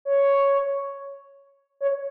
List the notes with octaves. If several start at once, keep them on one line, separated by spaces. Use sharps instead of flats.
C#5
C#5